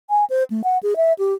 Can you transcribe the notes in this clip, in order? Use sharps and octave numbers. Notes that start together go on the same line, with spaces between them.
G#5
C5
A3
F#5
G#4
E5
G4